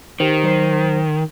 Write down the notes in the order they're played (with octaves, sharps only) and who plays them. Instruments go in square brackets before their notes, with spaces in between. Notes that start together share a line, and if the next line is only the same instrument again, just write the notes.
[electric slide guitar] D#3 [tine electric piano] G4 C5
[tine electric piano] F#3 C5 C7